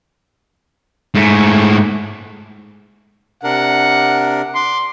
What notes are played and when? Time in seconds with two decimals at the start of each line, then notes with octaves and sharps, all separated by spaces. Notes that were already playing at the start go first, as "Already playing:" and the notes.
1.15 G#2 A3
3.44 C3 D4 A#4 F#5
4.55 C6 D6